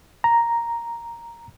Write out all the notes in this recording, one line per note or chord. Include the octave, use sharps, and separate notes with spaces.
A#5